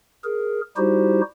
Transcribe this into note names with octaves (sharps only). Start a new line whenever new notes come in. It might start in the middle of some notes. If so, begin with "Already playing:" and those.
G#4 A#4
G3 D#4 E4 F#4 G4 C5